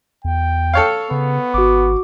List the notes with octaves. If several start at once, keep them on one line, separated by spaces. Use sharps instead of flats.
E2 G5
A4 C#5 F5
C#3 B3
G#1 F#4 D6